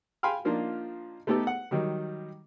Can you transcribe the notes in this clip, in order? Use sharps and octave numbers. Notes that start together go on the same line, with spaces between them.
F5 G5 G#5 B5 C6 F6
F3 A#3 D4 D#4 F4
A3 B3 D#4 G4 A4
F#5
D#3 F#3 G3